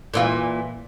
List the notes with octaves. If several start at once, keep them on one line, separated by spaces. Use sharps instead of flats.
A#2 E3 F4